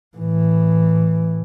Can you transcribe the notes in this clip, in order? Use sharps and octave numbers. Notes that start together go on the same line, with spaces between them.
A2 E3